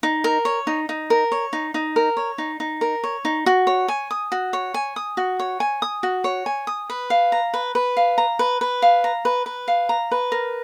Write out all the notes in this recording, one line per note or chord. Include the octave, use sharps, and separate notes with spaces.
D#4
A#4
C#5
D#4
D#4
A#4
C#5
D#4
D#4
A#4
C#5
D#4
D#4
A#4
C#5
D#4
F#4
C#5
G#5
D#6
F#4
C#5
G#5
D#6
F#4
C#5
G#5
D#6
F#4
C#5
G#5
D#6
B4
F5
A#5
B4
B4
F5
A#5
B4
B4
F5
A#5
B4
B4
F5
A#5
B4
A#4